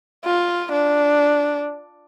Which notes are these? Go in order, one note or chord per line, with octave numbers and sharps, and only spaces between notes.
F4
D4